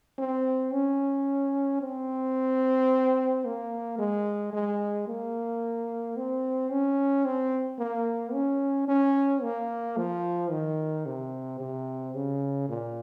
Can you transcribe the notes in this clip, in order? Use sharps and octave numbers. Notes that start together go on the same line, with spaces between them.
C4
C#4
C4
A#3
G#3
G#3
A#3
C4
C#4
C4
A#3
C#4
C#4
A#3
F3
D#3
C3
C3
C#3
A#2